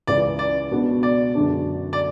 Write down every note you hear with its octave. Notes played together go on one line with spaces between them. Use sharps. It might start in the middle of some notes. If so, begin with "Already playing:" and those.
C#2 C#3 E3 D5
D5
B2 G#3 B3 D4 F#4
D5
F#2 D3 G#3 D4 F#4
D5